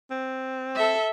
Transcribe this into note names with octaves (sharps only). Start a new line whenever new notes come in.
C4
A4 E5